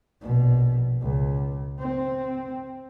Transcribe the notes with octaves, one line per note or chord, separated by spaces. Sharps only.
A#1 B2
C#2
C4